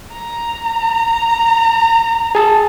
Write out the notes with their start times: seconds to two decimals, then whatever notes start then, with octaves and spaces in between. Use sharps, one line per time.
0.13 A#5
2.35 G#4 A5